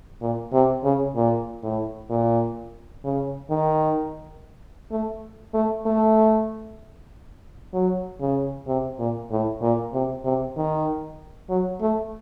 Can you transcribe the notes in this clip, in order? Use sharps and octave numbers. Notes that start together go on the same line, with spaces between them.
A#2
C3
C#3
A#2
A2
A#2
C#3
D#3
A3
A3
A3
F#3
C#3
C3
A#2
A2
A#2
C3
C3
D#3
F#3
A3